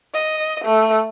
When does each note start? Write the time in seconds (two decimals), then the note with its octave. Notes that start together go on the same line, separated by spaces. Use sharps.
0.14 D#5
0.64 A3